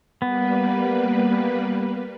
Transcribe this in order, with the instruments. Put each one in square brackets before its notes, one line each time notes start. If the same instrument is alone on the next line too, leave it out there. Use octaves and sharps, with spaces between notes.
[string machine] G3 A#3 B4 [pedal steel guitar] B3